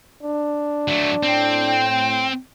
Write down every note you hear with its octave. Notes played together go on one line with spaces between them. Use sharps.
D4
F#3 A3
A2 C4 G5